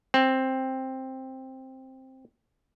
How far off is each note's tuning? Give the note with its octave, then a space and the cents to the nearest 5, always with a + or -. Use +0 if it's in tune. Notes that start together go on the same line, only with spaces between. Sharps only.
C4 +5